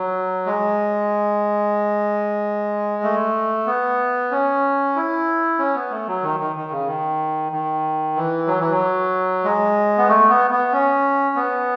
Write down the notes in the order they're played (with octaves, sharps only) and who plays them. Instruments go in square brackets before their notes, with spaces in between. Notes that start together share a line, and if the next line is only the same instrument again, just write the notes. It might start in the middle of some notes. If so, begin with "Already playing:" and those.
Already playing: [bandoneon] F#3
G#3
A3
B3
C#4
E4
C#4
B3
A3
F#3
D#3
D#3
D#3
C#3
D#3
D#3
E3
F#3
E3
F#3
G#3
B3
A3
B3
B3
C#4
B3